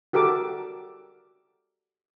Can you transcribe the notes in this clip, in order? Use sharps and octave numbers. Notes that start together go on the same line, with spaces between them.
F#4 G4 A4 A#4 D6